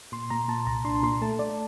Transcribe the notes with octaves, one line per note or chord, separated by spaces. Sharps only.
A#2 C6
A#2 A#5
A#2 A5
C2 A#5
D4 C6
A#2 C6
A3 A5
A3 D5